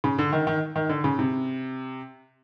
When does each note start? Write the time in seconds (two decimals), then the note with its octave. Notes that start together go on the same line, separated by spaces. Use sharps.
0.04 C#3
0.18 D3
0.33 D#3
0.47 D#3
0.76 D#3
0.89 D3
1.04 C#3
1.19 C3